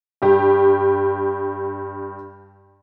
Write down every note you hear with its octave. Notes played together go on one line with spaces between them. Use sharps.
G2 G4